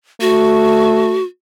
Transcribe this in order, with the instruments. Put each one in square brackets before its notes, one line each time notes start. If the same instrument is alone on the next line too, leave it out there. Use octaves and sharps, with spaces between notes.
[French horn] A3 [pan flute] F#4